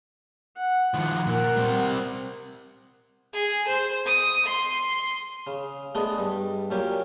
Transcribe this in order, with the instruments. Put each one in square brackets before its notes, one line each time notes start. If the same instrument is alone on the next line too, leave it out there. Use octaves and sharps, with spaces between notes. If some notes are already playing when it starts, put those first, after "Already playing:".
[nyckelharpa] F#5
[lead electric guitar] D#3 F3
[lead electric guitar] A#2 [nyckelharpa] A#4 F#5
[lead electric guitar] G3 C4
[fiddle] G#4
C5
D#6
C6
[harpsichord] C#3
G#3 A3 B3 D4 G#4 D#5
G2
F#2 A#2 C#4 G4 G#5